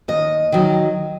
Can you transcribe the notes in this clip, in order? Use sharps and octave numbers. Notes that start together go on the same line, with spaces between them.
D#2 D#5
D#3 F#3